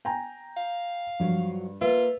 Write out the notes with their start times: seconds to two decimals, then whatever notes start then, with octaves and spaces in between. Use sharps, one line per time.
0.05 G5 G#5 A#5
0.57 F5
1.20 G2 F3 F#3
1.81 A#3 F4 B4 E5